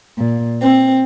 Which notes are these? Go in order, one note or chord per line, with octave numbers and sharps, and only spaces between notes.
A#2
C4